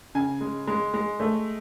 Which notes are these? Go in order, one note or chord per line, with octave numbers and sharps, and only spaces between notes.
C#3 G#5
G#3
G#3
G#3
A3